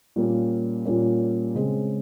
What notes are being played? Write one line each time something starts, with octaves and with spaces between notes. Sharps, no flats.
A#2 G3 A#3 C#4
A#2 G3 A#3 C#4
C#3 G#3 C4